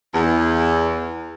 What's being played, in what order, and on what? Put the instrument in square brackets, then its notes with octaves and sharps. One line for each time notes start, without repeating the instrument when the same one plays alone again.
[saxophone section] E2